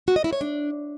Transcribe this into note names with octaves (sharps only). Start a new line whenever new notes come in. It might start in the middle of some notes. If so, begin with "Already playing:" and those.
F#4
D#5
E4
C#5
D4